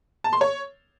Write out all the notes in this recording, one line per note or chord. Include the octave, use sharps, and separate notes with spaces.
A5
C6
C#5